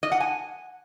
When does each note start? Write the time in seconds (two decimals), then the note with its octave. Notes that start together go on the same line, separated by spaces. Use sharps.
0.03 D#5
0.12 F#5
0.20 G#5